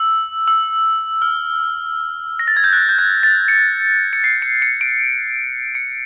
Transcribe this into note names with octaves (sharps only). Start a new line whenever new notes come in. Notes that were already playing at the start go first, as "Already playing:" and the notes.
Already playing: E6
E6
F6
A#6
A6
G#6
G6
F#6
G6
G#6
A6
C#7
C#7
C7
C#7
C#7
D7
C#7